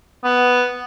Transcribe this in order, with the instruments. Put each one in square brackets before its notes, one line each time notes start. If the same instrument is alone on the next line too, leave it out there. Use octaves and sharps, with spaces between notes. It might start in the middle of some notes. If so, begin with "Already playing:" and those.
[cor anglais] B3